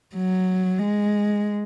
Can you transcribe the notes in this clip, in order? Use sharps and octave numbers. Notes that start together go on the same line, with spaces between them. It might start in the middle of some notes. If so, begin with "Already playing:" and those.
F#3
G#3